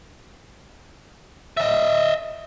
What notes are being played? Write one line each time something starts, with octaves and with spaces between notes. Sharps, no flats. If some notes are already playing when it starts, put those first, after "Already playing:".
D#5 E5